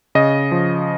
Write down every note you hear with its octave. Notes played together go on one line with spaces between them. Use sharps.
C#3 D#5
F3